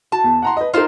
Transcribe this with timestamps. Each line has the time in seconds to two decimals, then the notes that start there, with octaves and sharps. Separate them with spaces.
0.12 F#4 A5
0.24 E2
0.42 F#5 A#5 C6
0.57 B4 D#5
0.73 D#4 F4 A#4 C5